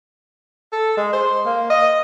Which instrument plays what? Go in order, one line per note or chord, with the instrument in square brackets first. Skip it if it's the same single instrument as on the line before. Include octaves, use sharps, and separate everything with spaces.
[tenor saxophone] A4
G#3
C5
A#3
D#5